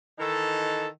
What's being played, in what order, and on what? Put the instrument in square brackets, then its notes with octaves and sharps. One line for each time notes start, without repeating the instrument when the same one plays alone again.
[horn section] D#3 E3 D#4 A4